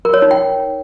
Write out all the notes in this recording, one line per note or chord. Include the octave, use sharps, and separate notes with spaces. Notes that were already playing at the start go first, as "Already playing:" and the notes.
A#4
C#5
D#4
G5